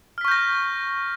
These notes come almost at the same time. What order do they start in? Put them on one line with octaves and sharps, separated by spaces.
F6 B6 C#6 G6 A#6